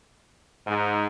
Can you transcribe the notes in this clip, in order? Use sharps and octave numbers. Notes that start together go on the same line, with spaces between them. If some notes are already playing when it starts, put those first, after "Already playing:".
G#2